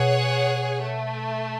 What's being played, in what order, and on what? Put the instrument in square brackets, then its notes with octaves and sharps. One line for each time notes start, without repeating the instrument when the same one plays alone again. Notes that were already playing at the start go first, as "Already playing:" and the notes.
Already playing: [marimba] B2 [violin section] G#4 C#5 F#5
[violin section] A3